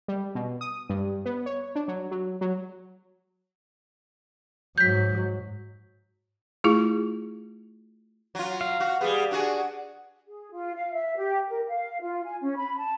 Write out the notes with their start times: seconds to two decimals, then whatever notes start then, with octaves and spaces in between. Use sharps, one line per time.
0.08 G3
0.35 B2
0.61 D#6
0.89 G2
1.25 B3
1.46 C#5
1.75 D4
1.88 F#3
2.11 F#3
2.41 F#3
4.78 G#2 F#3 G6 B6
6.64 A3 E4 F4 G#4
8.35 F#3 F4
8.61 F5
8.80 F#4 F#5
9.01 G3 B3 G#4
9.31 D4 F#4 G#4 F#5
10.27 G#4
10.53 F4
10.76 F5
10.93 E5
11.17 G4
11.48 A#4
11.68 F5
12.01 F4
12.25 G#5
12.42 C#4
12.57 B5
12.78 A5